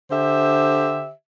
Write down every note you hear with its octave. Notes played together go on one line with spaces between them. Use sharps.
D3 G4 C5 E5